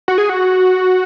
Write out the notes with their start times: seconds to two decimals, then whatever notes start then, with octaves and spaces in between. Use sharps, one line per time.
0.08 F#4
0.18 G#4
0.29 F#4